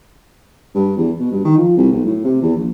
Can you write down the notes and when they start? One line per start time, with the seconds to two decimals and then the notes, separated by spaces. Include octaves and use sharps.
0.75 G2
0.97 E2
1.20 B2
1.31 G2
1.44 D#3
1.58 F3
1.77 C2
1.92 B1
2.05 A2
2.24 C3
2.42 E2
2.57 A#1